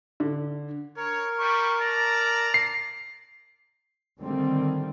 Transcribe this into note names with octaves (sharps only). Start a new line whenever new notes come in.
D3
A#4 C#5
G3 C#6
D5 A5 A#5
C7
D3 D#3 G3 A3 C4